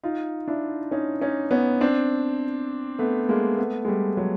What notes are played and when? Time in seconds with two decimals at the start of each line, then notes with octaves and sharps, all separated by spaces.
0.03 D#4 F4
0.48 D4 E4
0.91 C#4 D#4
1.21 C#4 D#4
1.51 B3 C#4
1.81 C4 D4
2.99 A3 B3
3.29 G#3 A#3
3.58 A3 B3
3.85 G#3
3.88 G3 A3
4.17 F#3 G#3